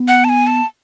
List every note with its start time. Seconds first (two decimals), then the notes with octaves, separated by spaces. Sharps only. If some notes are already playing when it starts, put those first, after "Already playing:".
Already playing: B3
0.08 F#5
0.24 A5
0.29 G#5
0.47 A5